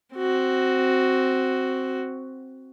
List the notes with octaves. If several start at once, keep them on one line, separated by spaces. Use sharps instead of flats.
C4 F#4